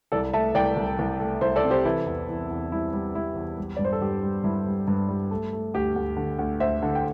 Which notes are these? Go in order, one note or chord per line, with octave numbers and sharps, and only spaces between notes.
C2 A4 D5
A3 E5 A5
C2 D5 G5
C2
C2
A3
C2 C5 E5
A4 D5
C3
G4 C5
E3 E4 A4
E2
E2
E2
G3 E4
G3
G3 E4
E2
G3
G2 D5
C5
A4
G2 G4
G3
G2 E4
G3
G2
G3
A3
A3
D2 G4
D2
D3
D2
D2 C5 E5
D3
G5